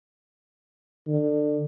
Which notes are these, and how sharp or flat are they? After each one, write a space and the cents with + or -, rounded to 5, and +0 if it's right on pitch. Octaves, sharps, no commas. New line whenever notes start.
D3 +25